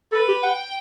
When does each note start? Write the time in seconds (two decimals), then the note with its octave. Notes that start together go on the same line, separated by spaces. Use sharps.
0.12 A4 B4
0.28 G4
0.43 F#5 G5